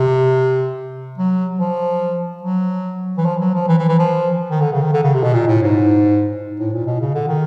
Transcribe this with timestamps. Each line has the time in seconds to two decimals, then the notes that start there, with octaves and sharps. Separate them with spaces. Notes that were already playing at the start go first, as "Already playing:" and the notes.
Already playing: C3
1.18 F#3
1.59 F3
2.43 F#3
3.17 E3
3.25 F3
3.40 F#3
3.54 F3
3.68 E3
3.78 E3
3.89 E3
3.99 F3
4.51 D#3
4.61 D3
4.72 C#3
4.82 D#3
4.93 D3
5.03 C#3
5.14 C3
5.23 B2
5.34 A#2
5.48 A2
5.62 G#2
6.60 A2
6.73 A#2
6.86 B2
7.01 C#3
7.14 D3
7.28 D#3